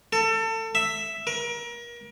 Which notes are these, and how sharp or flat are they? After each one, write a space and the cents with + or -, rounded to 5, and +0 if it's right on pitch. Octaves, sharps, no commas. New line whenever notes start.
A4 +30
E5 +0
A#4 +30